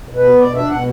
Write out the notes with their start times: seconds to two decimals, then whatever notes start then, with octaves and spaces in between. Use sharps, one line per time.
0.09 B2
0.17 B4
0.24 B3
0.39 B2 D5
0.55 D4 E5
0.69 B2 F#5